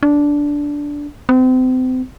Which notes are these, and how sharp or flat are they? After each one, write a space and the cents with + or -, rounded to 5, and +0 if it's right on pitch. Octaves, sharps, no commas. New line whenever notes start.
D4 -10
C4 -35